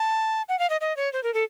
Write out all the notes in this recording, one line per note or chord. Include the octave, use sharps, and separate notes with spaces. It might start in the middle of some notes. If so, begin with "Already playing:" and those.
Already playing: A5
F#5
F5
D#5
D#5
C#5
C5
A#4
A4